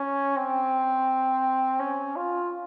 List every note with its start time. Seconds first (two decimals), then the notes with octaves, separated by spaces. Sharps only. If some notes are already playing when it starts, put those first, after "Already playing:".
Already playing: C#4
0.37 C4
1.80 C#4
2.16 F4